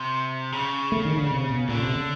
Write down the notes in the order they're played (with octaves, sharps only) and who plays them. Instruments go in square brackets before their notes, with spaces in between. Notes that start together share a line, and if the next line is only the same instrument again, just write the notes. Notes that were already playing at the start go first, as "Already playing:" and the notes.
Already playing: [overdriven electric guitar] C3
C#3
[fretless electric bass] A3
D#3
D3
C3
B2
[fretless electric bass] A#2 [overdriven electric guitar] D3
[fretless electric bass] C3
C#3